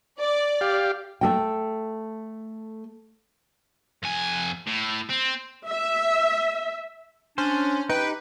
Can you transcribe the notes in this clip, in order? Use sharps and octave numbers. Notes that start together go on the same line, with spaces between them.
D5
G4 F5
A3 A4 G5
F2 G#5
A2
C4
E5
C#4 D4 C5
D#4 G4 B4 G5